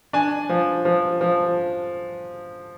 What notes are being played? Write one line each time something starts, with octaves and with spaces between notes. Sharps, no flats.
D4 G#5
F3
F3
F3